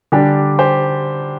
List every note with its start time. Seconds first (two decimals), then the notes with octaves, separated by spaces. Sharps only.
0.12 D3 G3 D4 G4
0.59 G4 C5